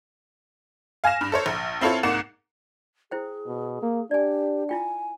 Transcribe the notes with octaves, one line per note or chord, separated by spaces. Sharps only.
F5 G#5 F6 A#6 E7
G2
A4 C5 C#5
A#1
C4 E4 F4 A4 C#5
C2 G#2 A#3 F#5 E7
E4 G#4 C5 G5
B2
A#3
D4 G4 D5 G#5
E4 F4 G5 G#5